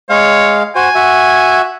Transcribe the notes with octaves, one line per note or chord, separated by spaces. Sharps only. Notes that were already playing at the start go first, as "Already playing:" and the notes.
G#3 C#5 F5
F#4 C5 G#5
F#4 E5